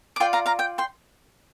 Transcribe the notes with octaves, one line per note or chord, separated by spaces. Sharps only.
D6
F4 D5 G5 C6
F5 A#5
F5 A#5
G5
G5 C6